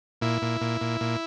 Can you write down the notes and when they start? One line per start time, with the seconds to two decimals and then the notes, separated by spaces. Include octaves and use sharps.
0.21 A#2 E4
0.42 A#2
0.61 A#2
0.81 A#2
1.01 A#2